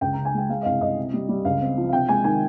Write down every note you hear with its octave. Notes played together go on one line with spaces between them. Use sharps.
C#2 G5
C#3 A#5
G#5
G#3 G5
G#3 F5
D#5
C2 F5
C2 D#5
C3
G3
G3
C#2 F5
C4
F3
F5
C3 G5
G#3 G#5
D#3 G#5